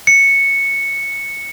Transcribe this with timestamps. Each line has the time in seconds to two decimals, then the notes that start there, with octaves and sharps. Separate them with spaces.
0.07 C#7